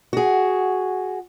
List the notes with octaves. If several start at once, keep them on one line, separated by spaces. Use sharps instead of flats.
F#4 G#4